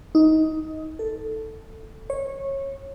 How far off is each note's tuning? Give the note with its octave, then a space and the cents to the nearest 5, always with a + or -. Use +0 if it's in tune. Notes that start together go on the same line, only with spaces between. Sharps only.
D#4 +20
A4 +5
C#5 -20